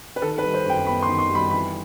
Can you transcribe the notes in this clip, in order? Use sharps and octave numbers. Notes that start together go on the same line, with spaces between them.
B4
D#3 A4
B4
G3
C5
F#2
G5
B3 B5
C6
D#3
C6
G3
B5
E3 B5